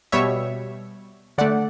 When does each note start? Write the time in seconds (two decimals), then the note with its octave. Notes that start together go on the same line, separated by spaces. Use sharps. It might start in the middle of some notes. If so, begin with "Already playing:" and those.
0.12 B2 G3 C#5 E5
1.38 D3 A3 D5 F#5